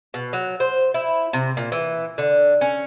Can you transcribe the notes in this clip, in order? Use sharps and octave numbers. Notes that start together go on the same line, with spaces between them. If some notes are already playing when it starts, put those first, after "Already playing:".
B2
F#3
C5
E4
C3
A#2
E3
D3
C#4